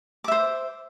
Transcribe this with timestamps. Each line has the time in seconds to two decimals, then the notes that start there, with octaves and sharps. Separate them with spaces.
0.24 D6
0.28 E5
0.32 C5